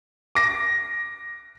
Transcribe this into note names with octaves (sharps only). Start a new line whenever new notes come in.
D6 A#6